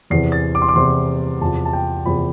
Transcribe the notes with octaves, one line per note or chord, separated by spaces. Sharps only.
E2 C3 E3 C7
A6
D6
C6
D6
E2 C3 E3 C6
E2 C3 F3 A5
A5
G5
E2 C3 F3 B5